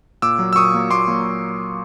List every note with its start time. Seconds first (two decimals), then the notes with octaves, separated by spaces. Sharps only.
0.22 A#2 D6 E6
0.39 F#3 A#3
0.53 E6
0.56 A#2 C#6 D#6
0.74 F#3 A#3
0.91 A#2 C6 D6
1.08 F#3 A#3